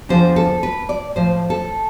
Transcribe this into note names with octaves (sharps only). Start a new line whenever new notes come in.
E2 D3 F3 C5
A4
B4
D5
A2 F3 C5
A4